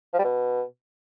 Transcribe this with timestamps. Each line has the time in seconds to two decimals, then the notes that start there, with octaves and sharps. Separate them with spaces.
0.13 F3
0.19 G3
0.24 B2